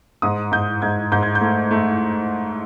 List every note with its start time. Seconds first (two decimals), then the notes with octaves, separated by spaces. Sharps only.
0.22 G#2 D#6
0.52 G#2 G6
0.82 G#2 G#6
1.12 G#2 G6
1.23 G#6
1.35 G6
1.41 A3
1.71 A3